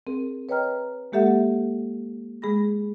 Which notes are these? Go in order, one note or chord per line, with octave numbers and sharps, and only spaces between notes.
C4 G#4 A#4
B4 C#5 D#5 G5 A#5 F6
G#3 A#3 G4 A4 E5 F#5
G#3 G#4 B5 A#6